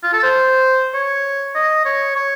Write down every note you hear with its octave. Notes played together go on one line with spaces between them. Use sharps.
F4
A4
C5
C#5
D#5
C#5
C#5